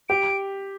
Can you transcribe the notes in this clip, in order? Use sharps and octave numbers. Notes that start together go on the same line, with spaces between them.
G4 D7